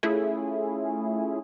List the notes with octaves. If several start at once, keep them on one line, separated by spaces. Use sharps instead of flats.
A3 C#4 E4 F4 G#4